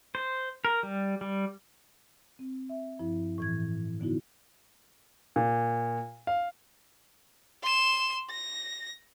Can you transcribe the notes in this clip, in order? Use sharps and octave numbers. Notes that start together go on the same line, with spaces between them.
C5
A#4
G3
G3
C4
E5
G2 F3 E4
A2 E3 G#6
D3 B3 D#4 E4 F#4
A#2
F5
C6 E7
A#6